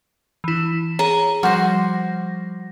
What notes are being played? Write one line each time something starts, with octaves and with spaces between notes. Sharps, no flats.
E3 E4
G#4 C#5 A#5
F3 G3 F#4 C5 A#6